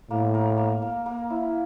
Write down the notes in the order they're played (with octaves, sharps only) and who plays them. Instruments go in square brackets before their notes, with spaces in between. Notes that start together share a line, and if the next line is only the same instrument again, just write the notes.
[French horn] A2 [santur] A#3
[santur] A#4
A#3
A#3
A#3
E4